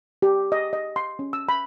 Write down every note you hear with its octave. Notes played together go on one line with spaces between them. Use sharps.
G4
D#5
D#5
C6
C#4
E6
B5